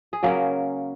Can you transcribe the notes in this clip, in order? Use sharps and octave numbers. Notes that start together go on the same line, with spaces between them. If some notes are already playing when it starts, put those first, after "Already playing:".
G#4
C#3 F#3 A#3 C#4 A#4